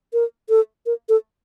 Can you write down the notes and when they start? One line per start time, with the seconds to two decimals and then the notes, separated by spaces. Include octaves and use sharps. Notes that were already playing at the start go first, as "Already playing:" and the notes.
0.13 A#4
0.49 A4
0.86 A#4
1.09 A4